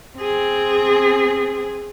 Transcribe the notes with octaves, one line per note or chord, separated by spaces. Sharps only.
C4 G#4